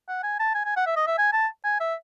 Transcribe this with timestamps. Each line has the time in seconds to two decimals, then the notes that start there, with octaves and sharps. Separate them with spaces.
0.09 F#5
0.24 G#5
0.40 A5
0.55 G#5
0.65 G#5
0.77 F#5
0.86 E5
0.96 D#5
1.07 E5
1.18 G#5
1.33 A5
1.64 G#5
1.80 E5